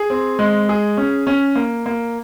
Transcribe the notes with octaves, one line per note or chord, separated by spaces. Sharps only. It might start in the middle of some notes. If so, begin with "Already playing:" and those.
Already playing: G#4
C4
G#3
G#4
C#4
C#4
A#3
A#3